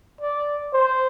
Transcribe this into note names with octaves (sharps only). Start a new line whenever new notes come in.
D5
C5